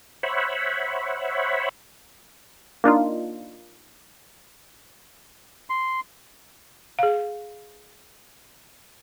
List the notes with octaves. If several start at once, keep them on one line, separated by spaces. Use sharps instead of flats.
C5 C#5 E5 F#5 B5
A#3 D4 D#4 F4
C6
G#4 F5